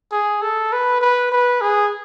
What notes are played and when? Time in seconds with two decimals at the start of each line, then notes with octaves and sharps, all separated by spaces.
0.12 G#4
0.42 A4
0.72 B4
1.01 B4
1.32 B4
1.61 G#4